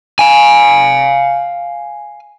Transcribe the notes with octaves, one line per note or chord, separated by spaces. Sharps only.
F5 G#5